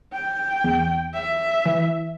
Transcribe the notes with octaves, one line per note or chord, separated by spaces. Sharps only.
G5
E2
E5
E3